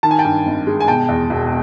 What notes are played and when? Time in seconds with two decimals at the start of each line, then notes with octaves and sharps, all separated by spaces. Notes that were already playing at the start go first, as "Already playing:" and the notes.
0.03 D#3 A5
0.11 G#5
0.19 G5 A5
0.25 G2
0.46 G#1
0.67 G#3
0.80 G#5
0.88 B2 G5 A5
1.09 E2
1.30 E1